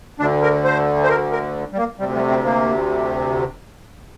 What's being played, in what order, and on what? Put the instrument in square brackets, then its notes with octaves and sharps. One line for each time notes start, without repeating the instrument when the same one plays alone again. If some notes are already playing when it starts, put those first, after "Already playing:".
[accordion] D2 D4
D3
A#4
C5
C5
A#4
A#4
G3
A#3
D2 C3 G3
G3
C4
A#3